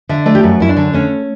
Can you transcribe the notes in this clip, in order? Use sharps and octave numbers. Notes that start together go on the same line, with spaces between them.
D3 E5
A3 D5
G4
F#2 F#4
F#2 E4
D4
D3
A3 C#4